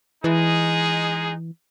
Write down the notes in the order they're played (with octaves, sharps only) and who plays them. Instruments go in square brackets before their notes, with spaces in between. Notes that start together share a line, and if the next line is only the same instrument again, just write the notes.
[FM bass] E3 [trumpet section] G#3 D#4 G#4